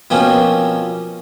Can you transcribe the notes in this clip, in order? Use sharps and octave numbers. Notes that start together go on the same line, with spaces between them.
B2 F3 A#3 C4 C#4